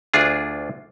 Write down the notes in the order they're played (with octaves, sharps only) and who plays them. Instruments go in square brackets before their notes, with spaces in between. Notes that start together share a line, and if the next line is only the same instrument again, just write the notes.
[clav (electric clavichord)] D2 D4 F4 G#4